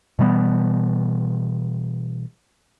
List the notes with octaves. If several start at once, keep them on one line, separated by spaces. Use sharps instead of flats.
B2 E3 G3 B3